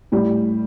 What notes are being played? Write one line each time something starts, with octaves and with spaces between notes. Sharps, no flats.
A2 G3